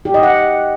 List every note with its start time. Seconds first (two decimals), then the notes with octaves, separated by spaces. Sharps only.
0.05 G4
0.14 D#5
0.23 F#5